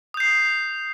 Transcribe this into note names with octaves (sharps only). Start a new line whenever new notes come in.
D#6 G6 C7